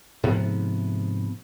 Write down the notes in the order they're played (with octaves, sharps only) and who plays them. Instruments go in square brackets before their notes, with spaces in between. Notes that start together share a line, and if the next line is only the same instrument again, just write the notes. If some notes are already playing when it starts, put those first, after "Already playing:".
[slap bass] G#2 C3 F3 B3